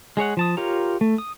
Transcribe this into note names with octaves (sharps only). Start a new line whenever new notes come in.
G#3 G#4 C#5 F#5
F3 A5 D#6
F4 G4 A#4 C#5 A#5
A3
D#6